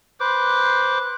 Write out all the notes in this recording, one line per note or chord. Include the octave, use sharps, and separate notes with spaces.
B4 C5 D6